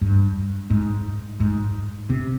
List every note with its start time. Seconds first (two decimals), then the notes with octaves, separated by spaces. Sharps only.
0.01 G2
0.70 G#2
1.40 G#2
2.10 C3